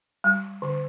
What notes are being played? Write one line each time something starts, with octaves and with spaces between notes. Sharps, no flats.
G3
D3